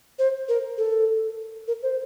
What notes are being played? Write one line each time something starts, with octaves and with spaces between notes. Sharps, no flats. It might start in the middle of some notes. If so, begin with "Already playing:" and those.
C5
A#4
A4
A#4
C5